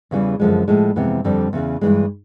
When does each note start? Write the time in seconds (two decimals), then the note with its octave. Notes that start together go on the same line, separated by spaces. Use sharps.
0.11 E2 C#3 E3 G3
0.40 F#2 D3 F3 G#3
0.68 A2 F3 G#3
0.96 F2 C3 E3 G#3 B3
1.24 F2 D3 G3 C4
1.53 E2 C#3 E3
1.81 G2 E3 G#3